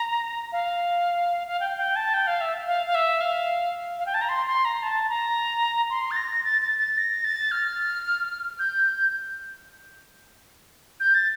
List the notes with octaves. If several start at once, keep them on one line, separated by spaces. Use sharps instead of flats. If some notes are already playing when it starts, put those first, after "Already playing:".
Already playing: A#5
F5
F5
G5
G5
A5
G5
F5
E5
F5
F5
E5
F5
F5
G5
A5
A#5
C6
C6
A#5
A5
A#5
C6
A6
A#6
A6
A6
A6
A#6
A6
F6
G6
G6
A6